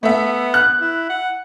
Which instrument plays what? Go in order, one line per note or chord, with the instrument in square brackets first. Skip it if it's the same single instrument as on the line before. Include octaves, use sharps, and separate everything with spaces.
[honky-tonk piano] A3 E5 [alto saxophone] B3
[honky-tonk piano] F#6
[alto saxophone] E4
F#5